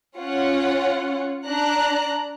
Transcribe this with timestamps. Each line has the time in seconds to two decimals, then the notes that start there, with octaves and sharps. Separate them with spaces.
0.17 C#4 F4 C#5 F#5
1.45 D4 A#5 F#6